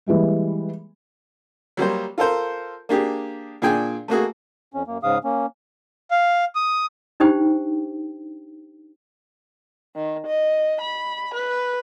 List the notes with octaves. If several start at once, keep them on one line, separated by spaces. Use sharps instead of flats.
E3 G3 G#3 A#3
F#3 G3 A#3 C5
F4 A4 A#4 C5
A#3 D4 G4 G#4
A#2 D4 G#4 G5 G#5
A3 A#3 F#4 G#4
F2 C#4
F#2 A#3
G#2 C#3 F5 D#6
A#3 C#4
F5
D#6
D4 D#4 G4 C5 G5
D#3
D#5
B5
B4